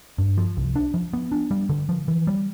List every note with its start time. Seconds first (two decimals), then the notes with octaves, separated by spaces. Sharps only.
0.18 G2
0.38 F3
0.57 C2
0.76 D4
0.94 F3
1.13 B3
1.32 D4
1.51 G3
1.69 D3
1.89 F3
2.08 E3
2.27 G3